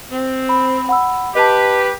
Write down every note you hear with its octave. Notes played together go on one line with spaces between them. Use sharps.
C4
B5
F#5 B5 E6
G4 B4 D#5 A5